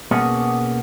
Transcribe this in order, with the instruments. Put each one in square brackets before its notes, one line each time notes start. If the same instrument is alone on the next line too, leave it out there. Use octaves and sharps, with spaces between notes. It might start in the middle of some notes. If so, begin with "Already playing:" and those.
[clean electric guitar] B2 A#3 B3 C#4 F#4 G#4